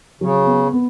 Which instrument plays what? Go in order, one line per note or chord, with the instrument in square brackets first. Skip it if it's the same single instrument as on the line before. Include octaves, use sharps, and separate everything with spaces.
[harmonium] C#3 [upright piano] F#3
[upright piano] B3
B3